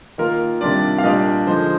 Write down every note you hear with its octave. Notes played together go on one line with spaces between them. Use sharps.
D#3 A#3 F4 A#4
C3 D#3 G3 D4 F4 D5
F5
A#2 G3 A#3 D4 D#5
D3 F3 G#3 D#4 C5